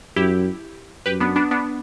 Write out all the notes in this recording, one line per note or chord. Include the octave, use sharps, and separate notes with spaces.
F#2 E4 G4
F#2 G4 B4
B3 D4
B3 D4
B3 D4